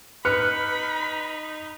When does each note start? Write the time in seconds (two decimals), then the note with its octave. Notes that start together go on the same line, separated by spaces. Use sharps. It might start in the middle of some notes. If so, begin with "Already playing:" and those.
0.25 D#4 B4 B5 F6 F#6 C#7